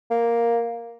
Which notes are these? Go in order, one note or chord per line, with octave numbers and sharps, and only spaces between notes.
A#3